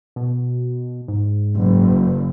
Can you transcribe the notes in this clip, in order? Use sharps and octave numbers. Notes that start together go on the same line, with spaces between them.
B2
G#2
F#1